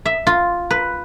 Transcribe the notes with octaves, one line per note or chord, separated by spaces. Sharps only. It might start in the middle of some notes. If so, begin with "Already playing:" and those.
E5
F4
B4